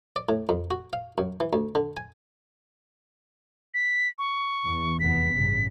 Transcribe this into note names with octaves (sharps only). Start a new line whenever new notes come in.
D5
A2
F2
F#4
F5
F#2
E3
D2
D3
G#5
B6
C#6
E2
F1 E2 B3 B6
A1 G2 C#3